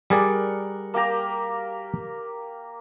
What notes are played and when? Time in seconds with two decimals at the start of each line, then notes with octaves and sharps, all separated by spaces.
0.10 G3 G#4 A#4 D5 F#5
0.94 A#3 G4 A#5